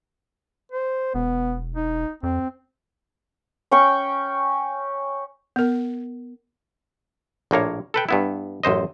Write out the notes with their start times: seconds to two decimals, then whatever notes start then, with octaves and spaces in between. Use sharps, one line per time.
0.72 C5
1.15 E1 B3
1.76 D#4
2.23 F2 C4
3.71 C#4 G5 C#6
5.56 B3 A#4
7.51 A#1 A2 A#3 C#5
7.94 A4 B4 G5
8.09 G2 B3 E4
8.63 A1 F#2 C5 D#5